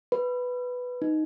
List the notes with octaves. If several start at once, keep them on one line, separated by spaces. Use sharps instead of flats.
B4
D#4